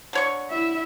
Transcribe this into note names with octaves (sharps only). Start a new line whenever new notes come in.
D3 C#5 C#6
E4 E5